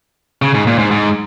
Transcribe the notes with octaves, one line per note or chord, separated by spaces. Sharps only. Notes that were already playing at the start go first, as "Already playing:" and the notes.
C#3
G#2
A#2
G#2
G#2